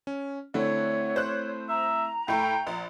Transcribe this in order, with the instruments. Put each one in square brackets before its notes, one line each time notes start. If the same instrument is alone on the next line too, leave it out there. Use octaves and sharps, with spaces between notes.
[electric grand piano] C#4
[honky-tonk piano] D3 [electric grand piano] A3 C4 E4 [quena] C#5
[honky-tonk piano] C5 F#6
[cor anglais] E5 [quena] A#5
[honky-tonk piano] A2 A3 [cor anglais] G5
[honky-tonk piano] A#1